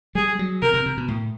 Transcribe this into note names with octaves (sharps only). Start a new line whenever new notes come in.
G3 G#4
F#3
C3 A#4
C3
C3
B2
A2